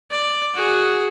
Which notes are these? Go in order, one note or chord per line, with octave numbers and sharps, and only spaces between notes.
D5
F#4 G#4